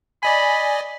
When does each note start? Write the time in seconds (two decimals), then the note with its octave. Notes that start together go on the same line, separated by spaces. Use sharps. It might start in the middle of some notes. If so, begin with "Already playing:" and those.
0.23 D5 D#5 G#5 B5